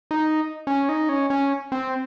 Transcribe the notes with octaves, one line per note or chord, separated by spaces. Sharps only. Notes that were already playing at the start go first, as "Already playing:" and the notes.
D#4
C#4
D#4
C#4
C#4
C4